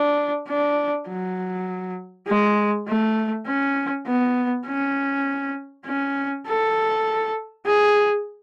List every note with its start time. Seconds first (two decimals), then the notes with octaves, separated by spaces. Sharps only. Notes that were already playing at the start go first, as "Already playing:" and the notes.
Already playing: D4
0.48 D4
1.08 F#3
2.27 G#3
2.88 A3
3.47 C#4
4.07 B3
4.67 C#4
5.86 C#4
6.47 A4
7.66 G#4